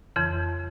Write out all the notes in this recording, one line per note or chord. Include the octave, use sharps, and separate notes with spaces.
F2 C#3 E3